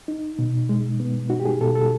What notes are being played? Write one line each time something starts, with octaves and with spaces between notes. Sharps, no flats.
D#4
B2
G#3
B3
D#4 F#4
G4
G#4
B2 A4
A4